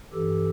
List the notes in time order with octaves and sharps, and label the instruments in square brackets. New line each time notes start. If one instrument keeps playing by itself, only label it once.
[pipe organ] G2 E3 G4 A4